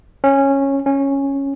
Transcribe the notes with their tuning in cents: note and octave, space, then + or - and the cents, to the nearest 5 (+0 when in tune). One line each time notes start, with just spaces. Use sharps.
C#4 -10
C#4 -5